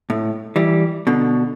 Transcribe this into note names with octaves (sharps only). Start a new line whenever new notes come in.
A2
E3 G3
B2 D3